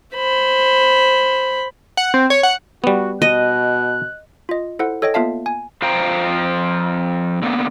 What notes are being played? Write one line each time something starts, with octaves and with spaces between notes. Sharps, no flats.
C5 B5
F#5
C4
C#5
F#5
G3 B3 F#4
B2 D#5 F#6
F4 D#5
E4 A4 C5 F#5
A4 C#5 D#5 G5 A#6
A#3 B3 F4 E5 F5 A5
G#5
F2 F3 C5 F5 G5 A#5
D3 A#3 B3